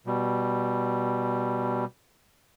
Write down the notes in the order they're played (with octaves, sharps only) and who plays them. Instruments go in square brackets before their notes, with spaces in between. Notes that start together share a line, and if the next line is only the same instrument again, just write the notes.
[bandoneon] B2 G3